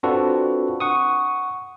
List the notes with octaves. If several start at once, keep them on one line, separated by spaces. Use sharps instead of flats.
C4 D4 F4 F#4 A4 B4
F#5 C#6 D#6